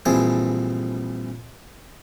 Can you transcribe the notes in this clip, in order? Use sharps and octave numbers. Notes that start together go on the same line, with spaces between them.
A#1 G2 E3 C4 G#4 A4